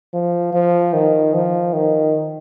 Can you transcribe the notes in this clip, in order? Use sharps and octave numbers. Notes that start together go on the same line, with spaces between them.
F3
F3
D#3
F3
D#3